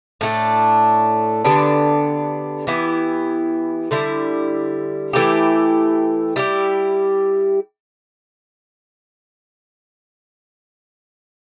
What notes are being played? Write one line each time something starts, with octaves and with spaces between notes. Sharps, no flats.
A2 A3 D4
D3 G3 B3 D4
E3 B3 E4 G4
D3 G3 E4
E3 A3 E4 G4
G3 E4 G4